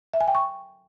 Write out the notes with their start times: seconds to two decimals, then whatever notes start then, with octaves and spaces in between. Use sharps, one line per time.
0.14 E5
0.21 G#5
0.28 G5
0.35 C#6